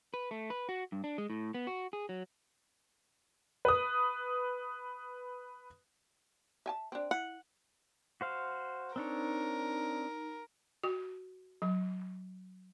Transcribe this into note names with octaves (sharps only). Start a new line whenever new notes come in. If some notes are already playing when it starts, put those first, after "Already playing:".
B4
A3
B4
F#4
G2
D4
G#3
A2
B3
F#4
G#4
F#3
B4 D#6
E5 G#5 A5
C4 D4
E4 F#5
F#4 C5 F5
C4 D4 D#4 A#4 C#5 B5
F#4
F#3